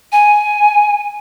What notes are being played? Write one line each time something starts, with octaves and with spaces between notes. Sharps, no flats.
G#5